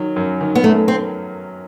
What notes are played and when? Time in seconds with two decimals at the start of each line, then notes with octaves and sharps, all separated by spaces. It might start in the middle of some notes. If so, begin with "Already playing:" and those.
Already playing: D#3 F#3
0.16 F#2
0.41 D#3
0.55 B3
0.64 F#2 A3
0.88 C4